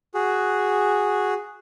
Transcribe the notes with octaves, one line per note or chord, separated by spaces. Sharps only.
F#4 G#4